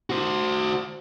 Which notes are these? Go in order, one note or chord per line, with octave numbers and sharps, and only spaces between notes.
F#4 C5